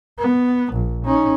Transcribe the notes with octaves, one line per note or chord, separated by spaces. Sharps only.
B3
A#1
C#4 D#4